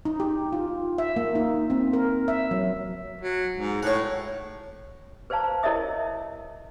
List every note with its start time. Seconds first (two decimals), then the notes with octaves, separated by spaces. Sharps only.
0.05 D#4
0.20 G4
0.53 F4
0.98 E5
1.16 A#3
1.35 D#4
1.70 C4
1.93 A#4
2.28 E5
2.51 F#3
3.21 F#3
3.57 G#2
3.83 A2 C#5 F#5
5.30 B4 C5 D5 F5 A5 A#5
5.63 E4 A#4 C#5 D#5 E5 D#6